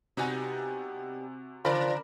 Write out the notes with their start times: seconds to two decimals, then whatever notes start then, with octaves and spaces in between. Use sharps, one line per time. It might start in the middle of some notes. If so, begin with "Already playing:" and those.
0.17 C3 G3 B3 D#4 F#4 G#5
1.65 C#3 F3 A#4 D5 B5